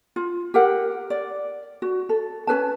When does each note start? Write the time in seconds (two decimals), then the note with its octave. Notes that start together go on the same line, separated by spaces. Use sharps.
0.16 F4
0.54 G4 A#4 F#5
1.10 D5
1.82 F#4
2.09 A4
2.47 C#4 G#4 B4 A5